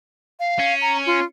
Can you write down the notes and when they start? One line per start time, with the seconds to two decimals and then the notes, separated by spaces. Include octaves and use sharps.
0.40 F5
0.59 C#4
0.82 A#5
1.06 F4